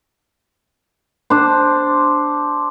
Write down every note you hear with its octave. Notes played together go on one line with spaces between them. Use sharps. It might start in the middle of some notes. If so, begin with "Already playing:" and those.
D4 C5